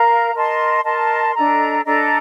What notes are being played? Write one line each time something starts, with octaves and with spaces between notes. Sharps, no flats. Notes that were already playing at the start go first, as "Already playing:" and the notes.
Already playing: A#4 F5 A#5
A#4 D#5 A5 C6
A#4 D#5 A5 C6
D4 A4 D#5 A#5
D4 A4 D#5 A#5